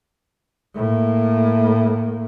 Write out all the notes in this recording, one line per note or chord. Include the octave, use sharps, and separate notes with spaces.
A2 A#3